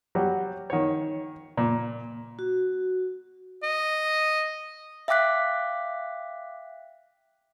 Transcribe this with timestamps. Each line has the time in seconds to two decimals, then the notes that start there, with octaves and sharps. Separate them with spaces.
0.15 F#3 G3
0.70 D#3 C#5
1.57 A#2
2.39 F#4
3.63 D#5
5.08 E5 F5 G5 D6 F#6 B6